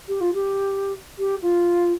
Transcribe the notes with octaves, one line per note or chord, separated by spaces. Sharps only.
G4
F4
G4
G4
F4